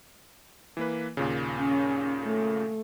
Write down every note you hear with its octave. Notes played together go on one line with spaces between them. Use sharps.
E3 A#3 B4
D#2 A#2 C#3
C#4
A3